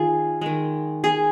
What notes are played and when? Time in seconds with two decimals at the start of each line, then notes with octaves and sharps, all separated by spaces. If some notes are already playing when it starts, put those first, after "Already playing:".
Already playing: D#3 F4 G#4
0.41 D#3 G#3
1.04 G#4